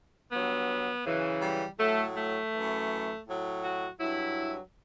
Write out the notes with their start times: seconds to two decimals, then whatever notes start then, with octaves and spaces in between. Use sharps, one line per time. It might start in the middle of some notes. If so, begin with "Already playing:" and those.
0.31 G2 F#3 B3
1.05 F#2 C#3 E3
1.41 G3
1.78 A2 F#3 A3
2.16 A3
2.52 E3
2.57 F#2
3.27 A2 F#3
3.63 F#4
4.00 G2 F#3 E4